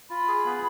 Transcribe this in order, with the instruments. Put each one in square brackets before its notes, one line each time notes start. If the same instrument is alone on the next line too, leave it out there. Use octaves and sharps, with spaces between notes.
[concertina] F4 [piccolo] B5
[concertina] G#4
B3